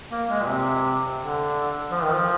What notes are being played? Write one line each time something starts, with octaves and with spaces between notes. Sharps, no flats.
A#3
G#3
A#2
C3
D3
F3
D#3
F3